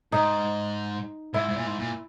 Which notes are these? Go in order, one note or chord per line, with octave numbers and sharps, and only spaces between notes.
G#2 D#4
G#2 E4
G#2
A#2
G#2
A#2